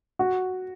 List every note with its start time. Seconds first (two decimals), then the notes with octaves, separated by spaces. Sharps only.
0.19 F#4